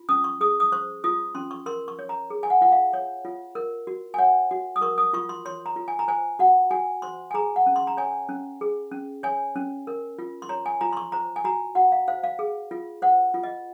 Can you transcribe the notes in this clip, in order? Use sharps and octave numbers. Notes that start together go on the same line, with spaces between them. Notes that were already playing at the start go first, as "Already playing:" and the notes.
Already playing: F4
C#4 D#6
C#6
G#4 D#6
D#6
C5 C#6
F4 D#6
C#4 C6
C#6
A#4 C6
C#6
C#5
A#5
G#4
G#5
F#5
F4 F#5
F5
C#5
F4
A#4
F#4
G#5
C#5 F#5
F#4
D#6
A#4 C#6
D#6
F4 C#6
C6
C#5 C6
A#5
F4
G#5
A#5
C5 G#5
F#4 F#5
F#4 G#5
C5 C6
G#5
G#4 A#5
F#5
C#4
C6
A#5
C#5 G#5
C#4
G#4
C#4
C#5 G#5
C#4
A#4
F4
C6
C#5 A#5
G#5
F4 A#5
C6
C#6
C5 A#5
G#5
F#4 A#5
F#4 F#5
F5
C5 F5
F5
G#4
F4
C5 F#5
F4
D#5